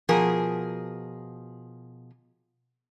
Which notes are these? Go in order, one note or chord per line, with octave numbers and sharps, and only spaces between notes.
B2 F3 G#4 A#4